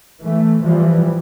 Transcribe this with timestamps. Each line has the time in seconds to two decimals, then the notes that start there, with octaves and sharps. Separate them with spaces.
0.22 E3 A3
0.61 E3 F3 G3